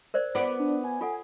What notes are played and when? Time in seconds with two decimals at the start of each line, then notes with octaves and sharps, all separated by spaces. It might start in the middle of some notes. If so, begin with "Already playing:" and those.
0.14 A#4 C5 D5
0.35 B3 F4 D5
0.59 D4
0.84 G#5
1.01 F4 A4 F#5